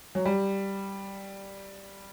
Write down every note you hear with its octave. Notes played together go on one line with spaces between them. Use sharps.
F#3
G3